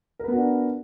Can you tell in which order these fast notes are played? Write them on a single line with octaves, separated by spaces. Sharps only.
A#4 B4 B3 F#4 D4